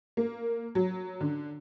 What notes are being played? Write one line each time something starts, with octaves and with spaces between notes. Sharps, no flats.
A#3
F#3
D3